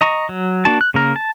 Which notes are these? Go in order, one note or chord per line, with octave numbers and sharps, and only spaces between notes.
D#5 A#5 C#6
F#3
A#3 D4 F#4 A5
F#6
C#3 A#3 A#4
A5